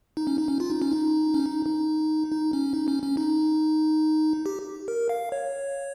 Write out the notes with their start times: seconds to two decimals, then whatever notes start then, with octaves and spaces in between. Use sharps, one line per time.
0.17 D#4
0.27 C#4
0.38 D#4
0.48 C#4
0.60 F4
0.70 D#4
0.82 C#4
0.92 D#4
1.34 C#4
1.46 D#4
1.66 D#4
2.32 D#4
2.53 C#4
2.74 D#4
2.88 C#4
3.03 C#4
3.17 D#4
4.46 G4
4.88 A#4
5.09 F5
5.32 C#5